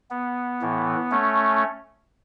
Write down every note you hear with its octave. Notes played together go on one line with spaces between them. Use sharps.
B3
A2 E3
A3 C#4